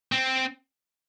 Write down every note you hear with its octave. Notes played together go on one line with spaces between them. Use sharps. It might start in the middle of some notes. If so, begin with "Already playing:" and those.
C4